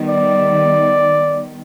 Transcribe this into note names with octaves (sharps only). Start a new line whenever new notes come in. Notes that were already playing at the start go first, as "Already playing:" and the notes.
Already playing: D#3 G3 B3
D5